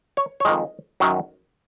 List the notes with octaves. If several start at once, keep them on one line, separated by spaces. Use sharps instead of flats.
C#5
C#5
F2 D#3 G#3 D#5
F#2 D#3 F#3